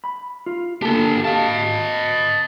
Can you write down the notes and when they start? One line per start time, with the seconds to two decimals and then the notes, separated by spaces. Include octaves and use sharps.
0.04 B5
0.46 F4
0.82 D3 A#3 G4 A4 A5
1.24 D#5 F5 A5